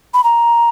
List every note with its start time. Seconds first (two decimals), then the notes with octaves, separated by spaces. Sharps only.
0.14 B5
0.24 A#5